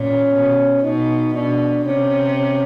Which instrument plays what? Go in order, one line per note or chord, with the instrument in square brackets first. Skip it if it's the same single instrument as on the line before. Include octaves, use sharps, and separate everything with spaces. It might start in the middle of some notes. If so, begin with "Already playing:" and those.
Already playing: [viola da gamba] A#2 [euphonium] C#4
[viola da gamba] B2
[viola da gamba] B2 [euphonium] D#4
[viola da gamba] B2 [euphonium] D4
[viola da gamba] C3 [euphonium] C#4
[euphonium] C#4